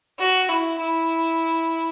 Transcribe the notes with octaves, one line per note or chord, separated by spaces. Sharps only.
F#4
E4
E4